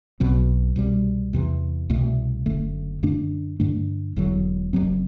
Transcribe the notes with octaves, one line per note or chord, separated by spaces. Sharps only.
B1 B2 F#3 C4
C2 B2 G3
E2 C3 E3
C2 B2 A3
F#1 F#2 D3 A3
F#2 D3 A3 D4
G2 D3 A3 D4
E1 E2 D3 F#3
F#1 F#2 F#3 C4